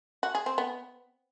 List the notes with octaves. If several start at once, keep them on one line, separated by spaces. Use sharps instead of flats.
F#4
G#4
C4
B3